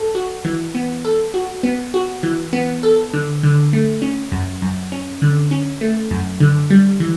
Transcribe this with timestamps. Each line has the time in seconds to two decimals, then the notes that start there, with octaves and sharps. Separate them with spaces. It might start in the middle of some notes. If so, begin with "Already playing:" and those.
Already playing: A4
0.15 F#4
0.45 E3
0.75 B3
1.05 A4
1.34 F#4
1.63 B3
1.94 F#4
2.23 E3
2.53 B3
2.83 A4
3.13 D3
3.43 D3
3.73 A3
4.02 C#4
4.32 F#2
4.62 F#2
4.92 C#4
5.22 D3
5.51 C#4
5.81 A3
6.11 F#2
6.40 D3
6.70 G3
7.00 E3